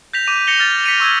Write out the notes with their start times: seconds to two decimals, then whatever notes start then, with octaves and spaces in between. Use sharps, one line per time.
0.13 G6 A#6 B6 F7
0.27 D6 D#7
0.47 A#6 C#7 F7 G7
0.59 F6 A6
0.84 B6 C#7 D#7 F7
1.00 C#6 E6 F6 G#6